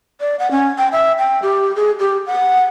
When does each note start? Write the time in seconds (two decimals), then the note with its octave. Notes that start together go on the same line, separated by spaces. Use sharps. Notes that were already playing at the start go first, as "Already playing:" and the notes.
0.21 D5
0.39 F#5
0.51 C#4
0.78 G5
0.92 E5
1.18 G5
1.42 G4
1.76 G#4
1.99 G4
2.27 F#5